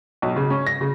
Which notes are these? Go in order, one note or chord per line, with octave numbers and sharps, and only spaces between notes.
B1
C#3
C#4
A#6
C#3